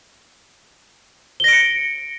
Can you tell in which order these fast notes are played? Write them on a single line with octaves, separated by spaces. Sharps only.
G7 A#6 D7 C#7